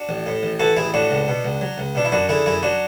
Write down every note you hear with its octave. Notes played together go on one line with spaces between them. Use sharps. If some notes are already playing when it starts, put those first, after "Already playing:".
Already playing: D4 F#4
A1
A2
A1
E3 F#4 A4
A1 E4 G#4
A2 D4 F#4
C#2
B2
C#2
F#3
C#2
B2 D4
E4
F#2 D4 F#4
D3 E4 G#4
F#2 E4 G#4
F#3 D4 F#4